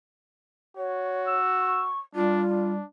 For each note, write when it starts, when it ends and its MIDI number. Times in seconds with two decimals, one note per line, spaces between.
0.77 1.92 66
0.77 1.35 73
1.27 1.83 88
1.61 1.98 85
2.15 2.79 55
2.15 2.43 62
2.15 2.71 65
2.50 2.85 62